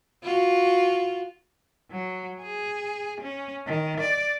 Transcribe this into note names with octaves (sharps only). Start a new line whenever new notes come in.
F4 F#4
F#3
G#4
C#4
D#3
D5